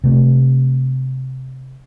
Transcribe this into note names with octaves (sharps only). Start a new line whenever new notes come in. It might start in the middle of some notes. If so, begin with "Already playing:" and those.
C3 A3